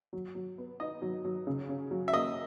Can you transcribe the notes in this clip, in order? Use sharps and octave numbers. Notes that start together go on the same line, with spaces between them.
F#3
F#3
B3
D#4 D#5
F#3
F#3
C#3
C#4
F#3
E5
A#3 D#5